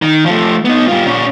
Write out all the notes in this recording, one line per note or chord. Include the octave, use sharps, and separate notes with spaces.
D#3
F3 A3
B3 D#4
G3 F4
A#2 C#4